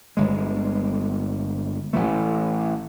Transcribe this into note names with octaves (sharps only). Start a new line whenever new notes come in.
G1 G#3
A1 E3 A3